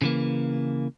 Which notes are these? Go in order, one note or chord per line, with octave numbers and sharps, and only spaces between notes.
C#3 E3 A#3